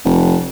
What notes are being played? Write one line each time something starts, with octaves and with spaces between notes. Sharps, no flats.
F1